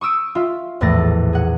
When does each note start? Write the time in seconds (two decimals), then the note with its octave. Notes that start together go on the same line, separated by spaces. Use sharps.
0.01 C#6 D#6 E6 D7 D#7
0.35 F4 E5
0.81 A#1 E2 A2 A3 A6 A#6
1.33 G#4 F#5